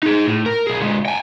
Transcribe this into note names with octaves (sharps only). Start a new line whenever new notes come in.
D#4 G#4
A2
A#4
B1 G#4
D3 G#3
G5 G#5